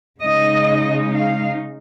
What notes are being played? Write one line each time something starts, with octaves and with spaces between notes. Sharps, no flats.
C#3 G#3 D#4 D#5
F5